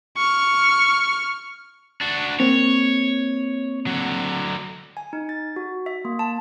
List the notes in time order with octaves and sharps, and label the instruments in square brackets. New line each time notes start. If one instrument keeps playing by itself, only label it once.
[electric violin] C#6 F6
[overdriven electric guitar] D4 F#4
[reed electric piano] A#3 C4 [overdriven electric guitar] C#5
[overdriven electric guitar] D3 F#3
[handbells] G#5
D#4
A6
F#4
E5
A#3
A5